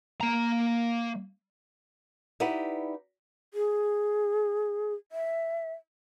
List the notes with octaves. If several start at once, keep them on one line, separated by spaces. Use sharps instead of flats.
A#3 A#5
D#4 E4 G4 B4 D5 F#5
G#4
E5